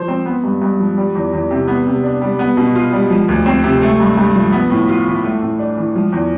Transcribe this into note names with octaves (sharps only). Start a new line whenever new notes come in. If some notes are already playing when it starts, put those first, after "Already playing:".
Already playing: F3 C5
C4
B3
G2
G2
F3
G3
E2
E2
C3
B3
C3
D4
G3
B3
B2
F4
G3
F3
D2
C4
C3
A3
G2
G2
F3
B3
A2
F4
E3
A3
A2
D4
E3
F3
E2